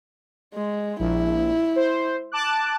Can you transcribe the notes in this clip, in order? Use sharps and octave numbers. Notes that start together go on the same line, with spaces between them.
G#3
A#1 E4
C5
A5 D6 F#6